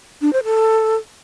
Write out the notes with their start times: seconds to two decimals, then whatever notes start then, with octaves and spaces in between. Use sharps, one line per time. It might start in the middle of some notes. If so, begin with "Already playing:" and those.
0.21 D4
0.33 C5
0.44 A4